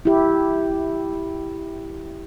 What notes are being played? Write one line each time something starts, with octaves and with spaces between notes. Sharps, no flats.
E4 G4